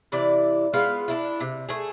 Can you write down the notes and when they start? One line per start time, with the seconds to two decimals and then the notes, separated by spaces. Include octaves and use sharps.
0.12 C3 E3 E4 D5
0.74 G#3 B3 F4 F5
1.08 D4 E4 F4
1.40 C3
1.69 A3 G#4